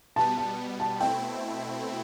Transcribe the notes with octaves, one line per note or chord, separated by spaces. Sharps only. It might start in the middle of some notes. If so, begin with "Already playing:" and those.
B2 G3 B3 A5
A5
A5
B2 A3 C4 E4 G5